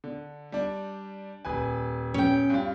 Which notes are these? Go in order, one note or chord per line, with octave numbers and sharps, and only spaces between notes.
D3
G3 D4
D#1 B4 G#5
C#4 G5
G2 F4